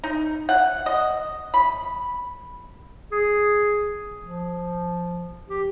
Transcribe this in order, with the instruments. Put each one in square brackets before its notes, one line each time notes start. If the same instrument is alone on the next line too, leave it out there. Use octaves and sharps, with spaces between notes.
[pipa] D#4
F#5
D#5
B5
[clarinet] G#4
F3
G4